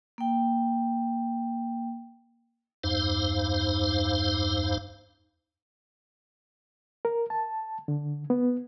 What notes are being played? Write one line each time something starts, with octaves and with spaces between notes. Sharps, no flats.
A#3 G5
E2 G2 D#4 C5 F5
A#4
A5
D3
B3